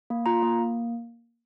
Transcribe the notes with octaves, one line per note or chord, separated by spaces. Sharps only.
A#3
F4 A#5
A#3
A#3